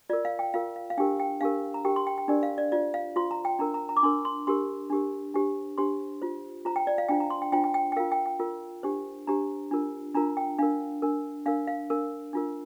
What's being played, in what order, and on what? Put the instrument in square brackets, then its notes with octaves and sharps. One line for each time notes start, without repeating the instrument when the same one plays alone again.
[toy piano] F4 D5
A#4
F5
G5
F4 A#4 F5
F5
F5
D4 G4 A#4 G5
G5
D4 G4 A#4 F5
A#5
D4 G4 A#4 G5
C6
G5
G5
D4 G4 A#4 D5
F5
D5
F4 C5 D5
F5
F4 C5 C6
A#5
G5
D4 A#4 A#5
A#5
A#5
D6
D4 A#4 C6
C6
D4 G4 A#4 C6
D4 G4 A#4
D4 G4 C5
D4 G4 C5 C6
F4 C5
F4 C5 A#5
G5
D5
F5
D4 F4 C5 G5
A#5
C6
G5
D4 F4 C5 G5
G5
G5
G5
A#4 F5
F4
G5
G5
F4 A#4
D4 G4 C5
D4 G4 C5 A#5
D4 F4 A#4
D4 F4 A#4 A#5
G5
D4 A#4 F5
D4 A#4
D4 A#4 F5
F5
D4 A#4
D4 F4 A#4